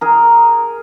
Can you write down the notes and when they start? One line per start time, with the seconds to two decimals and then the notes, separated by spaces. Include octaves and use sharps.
0.01 G#4 A#4